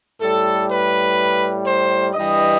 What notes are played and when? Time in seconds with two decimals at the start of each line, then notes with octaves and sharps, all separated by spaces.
0.21 A2 G3 A4
0.70 B4
1.65 C5
2.14 G2 E3 G3 D#5